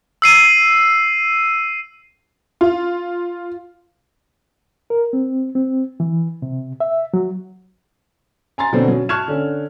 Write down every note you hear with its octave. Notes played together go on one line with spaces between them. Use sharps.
E6 C7 D#7
F4
A#4
C4
C4
E3
C3
E5
F#3
G#5 A#5 C6 A6
B2 D3 F#3 C4
F#3 C#4
A5 C#6 F6 F#6 G#6 E7
D3 C#4